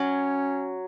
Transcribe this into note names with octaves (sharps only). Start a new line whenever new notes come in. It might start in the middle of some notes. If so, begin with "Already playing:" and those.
Already playing: F#3 C#4